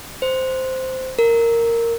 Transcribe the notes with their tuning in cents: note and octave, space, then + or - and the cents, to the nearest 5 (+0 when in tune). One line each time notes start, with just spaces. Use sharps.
C5 -5
A#4 -10